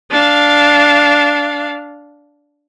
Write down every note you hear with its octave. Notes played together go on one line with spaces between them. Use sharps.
D4 F5